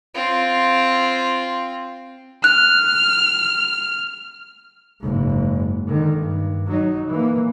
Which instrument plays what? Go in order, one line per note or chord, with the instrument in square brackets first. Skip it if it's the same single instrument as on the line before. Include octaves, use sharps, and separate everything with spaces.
[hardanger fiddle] C4 F4
[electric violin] F6 [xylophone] F#6
[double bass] F#1 G#2
D3 D#3
G2
F#3 D#4
E3 A#3